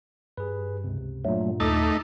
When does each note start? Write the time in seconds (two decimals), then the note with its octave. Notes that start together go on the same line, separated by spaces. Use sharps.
0.38 G2 G#4 B4
0.84 C#2 C3
1.25 G2 A#2 F#3 A3
1.60 D#2 A3 D#4 A4 D6